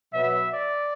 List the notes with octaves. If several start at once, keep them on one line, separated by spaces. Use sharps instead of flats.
B2 F#3 B3 E5
D5